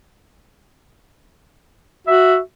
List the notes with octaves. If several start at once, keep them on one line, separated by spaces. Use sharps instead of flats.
F#4 E5